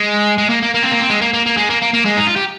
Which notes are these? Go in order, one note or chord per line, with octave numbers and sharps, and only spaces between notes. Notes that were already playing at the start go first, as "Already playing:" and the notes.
Already playing: G#3
G#3
A#3
A#3
A#3
C4
A#3
C4
G#3
A#3
A#3
A#3
G#3
A#3
A#3
A#3
G#3
D#4
F4
G4